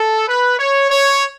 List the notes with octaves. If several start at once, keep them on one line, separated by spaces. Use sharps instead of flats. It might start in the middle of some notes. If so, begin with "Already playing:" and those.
Already playing: A4
B4
C#5
C#5